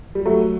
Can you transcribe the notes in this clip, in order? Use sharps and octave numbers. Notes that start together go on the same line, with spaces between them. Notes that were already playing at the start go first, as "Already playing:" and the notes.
G3
F#3 A3